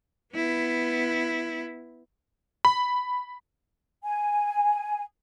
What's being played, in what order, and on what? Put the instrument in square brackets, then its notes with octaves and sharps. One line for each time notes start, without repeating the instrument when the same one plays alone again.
[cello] B3 E4
[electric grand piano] B5
[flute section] G#5